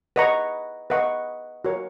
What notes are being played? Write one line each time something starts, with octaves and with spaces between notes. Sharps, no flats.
B4 D#5 F#5 A#5 C#6
B4 D#5 F#5 A#5 C#6
F#4 A#4 C#5